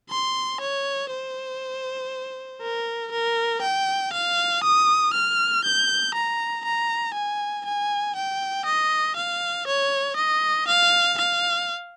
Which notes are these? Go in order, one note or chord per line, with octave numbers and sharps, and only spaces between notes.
C6
C#5
C5
A#4
A#4
G5
F5
D#6
F6
G6
A#5
A#5
G#5
G#5
G5
D#5
F5
C#5
D#5
F5
F5